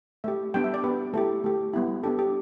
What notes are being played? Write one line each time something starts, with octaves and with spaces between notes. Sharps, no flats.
A3 G4 E5
G3 B3 D4 G4 G5
E5
D5
B3 G4 B4
A3 E4 G4 A4
A3 G4
G3 B3 E4
B3 D4 G4 A4
G4